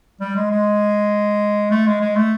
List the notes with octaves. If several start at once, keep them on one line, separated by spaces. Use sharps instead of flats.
G3
G#3
G#3
A3
G#3
G#3
A3